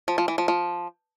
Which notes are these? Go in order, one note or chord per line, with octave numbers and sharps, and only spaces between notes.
F3
F3
E3
F3
F3